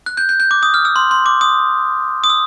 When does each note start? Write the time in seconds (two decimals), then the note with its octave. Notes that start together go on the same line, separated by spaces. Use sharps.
0.06 F#6
0.17 G6
0.29 G6
0.40 G6
0.51 D6
0.63 D#6
0.74 F6
0.85 E6
0.96 C6
1.11 C6
1.26 D6
1.41 D#6
2.24 D#6
2.30 E6